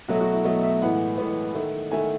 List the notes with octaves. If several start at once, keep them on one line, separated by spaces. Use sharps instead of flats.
B2 F#3 A3 F#4
F#4
E4
B2 F#3 A3 D#5
E5
A2 E3 G#3 B3 F#5
A2 E3 G#3 B3
D#3 A3
D#3 A3 G#5